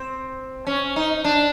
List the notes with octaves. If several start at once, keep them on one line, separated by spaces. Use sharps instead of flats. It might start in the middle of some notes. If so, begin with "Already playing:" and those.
Already playing: C4
C#4
D#4
D4